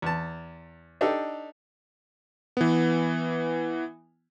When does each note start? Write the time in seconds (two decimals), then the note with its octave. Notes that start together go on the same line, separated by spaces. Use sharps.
0.02 E2 A5
1.01 D4 D#4 G4 A4
2.57 E3 B3